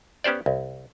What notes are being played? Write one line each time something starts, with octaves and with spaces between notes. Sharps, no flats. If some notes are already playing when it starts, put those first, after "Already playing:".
B3 C#4 G4 C5 D5
C2